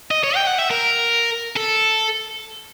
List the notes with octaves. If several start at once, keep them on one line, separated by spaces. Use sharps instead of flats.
D#5
C#5
G5
F#5
E5
A#4
A4